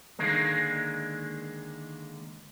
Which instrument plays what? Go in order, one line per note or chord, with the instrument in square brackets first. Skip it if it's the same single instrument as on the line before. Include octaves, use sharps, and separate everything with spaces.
[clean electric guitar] D3 D#3 G#3 A#3